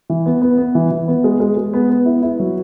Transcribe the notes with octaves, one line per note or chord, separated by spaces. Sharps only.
E3
B3
B3
B3
E3
E3
B3
G#3
G#3
G#3
B3
B3
E4
E4
F#3